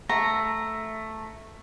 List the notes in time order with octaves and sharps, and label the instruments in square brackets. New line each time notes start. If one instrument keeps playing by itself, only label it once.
[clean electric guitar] A3 [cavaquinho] A#5